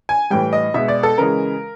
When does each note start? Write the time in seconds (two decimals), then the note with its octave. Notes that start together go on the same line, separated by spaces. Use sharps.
0.09 G#5
0.30 A2 E3 G3 G5
0.53 D#5
0.74 B2 G#3 E5
0.88 D5
1.03 A4
1.18 C#3 E3 G#3 A#4